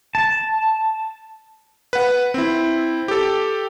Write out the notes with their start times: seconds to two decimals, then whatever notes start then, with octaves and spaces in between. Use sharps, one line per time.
0.15 A5
1.93 B4 F#5
2.34 C4 E4
3.08 G4 A4